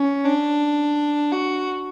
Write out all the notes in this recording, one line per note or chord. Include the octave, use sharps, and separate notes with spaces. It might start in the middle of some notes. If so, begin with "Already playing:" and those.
Already playing: C#4
D4
F#4